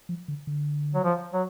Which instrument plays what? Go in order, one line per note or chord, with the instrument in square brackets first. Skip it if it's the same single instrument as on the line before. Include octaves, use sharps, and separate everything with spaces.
[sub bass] F3
D3
D3
[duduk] F#3
F3
F#3